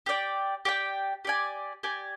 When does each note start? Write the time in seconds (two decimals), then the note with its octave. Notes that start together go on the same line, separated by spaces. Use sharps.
0.06 G4 D5 G5
0.65 G4 D5 G5
1.25 G4 D5 G#5
1.83 G4 D5 G#5